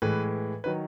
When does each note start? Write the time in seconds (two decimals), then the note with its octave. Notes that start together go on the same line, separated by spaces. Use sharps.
0.02 A2 E3 G#3 B4
0.64 D#3 F#3 B4